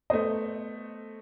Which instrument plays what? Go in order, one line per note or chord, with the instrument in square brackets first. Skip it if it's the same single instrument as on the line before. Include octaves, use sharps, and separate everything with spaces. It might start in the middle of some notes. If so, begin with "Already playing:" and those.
[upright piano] A3 B3 C5 D#5